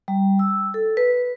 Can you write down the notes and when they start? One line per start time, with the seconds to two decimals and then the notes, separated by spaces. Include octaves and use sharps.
0.08 G3
0.39 E6
0.74 A4
0.97 B4